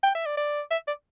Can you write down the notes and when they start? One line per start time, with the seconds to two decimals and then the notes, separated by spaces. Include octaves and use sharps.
0.03 G5
0.15 E5
0.26 D5
0.37 D5
0.71 E5
0.87 D5